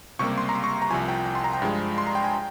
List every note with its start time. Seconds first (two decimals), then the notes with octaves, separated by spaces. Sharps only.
0.19 C#2 C3 G3 A#3 C#6
0.38 C6
0.49 A#5
0.55 C6
0.64 C#6
0.82 A#5
0.91 C2 C3 F3 G#5
1.08 G5
1.26 G5
1.35 C6
1.44 A#5
1.54 G5
1.62 G2 F3 G#3
1.98 C6
2.07 A#5
2.15 G5
2.24 G#5
2.34 G5